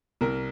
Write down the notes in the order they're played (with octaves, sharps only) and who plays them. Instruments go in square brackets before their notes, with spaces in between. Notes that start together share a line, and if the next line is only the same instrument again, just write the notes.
[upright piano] C2 A#4